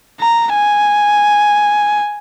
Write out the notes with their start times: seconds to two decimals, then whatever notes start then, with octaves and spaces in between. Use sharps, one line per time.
0.20 A#5
0.54 G#5